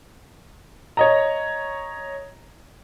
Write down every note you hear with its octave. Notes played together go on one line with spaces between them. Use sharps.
C#5 D#5 A#5